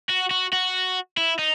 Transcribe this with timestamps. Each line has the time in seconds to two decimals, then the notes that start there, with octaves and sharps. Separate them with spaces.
0.09 F#4
0.31 F#4
0.53 F#4
1.17 E4
1.39 D#4